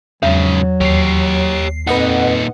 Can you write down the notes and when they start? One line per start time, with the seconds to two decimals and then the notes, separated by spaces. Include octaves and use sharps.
0.23 E2 G#2 C#3 F#3
0.81 D#2 G4 C#5 C7
1.87 F2 A#2 D#4 B4 D#5 F#5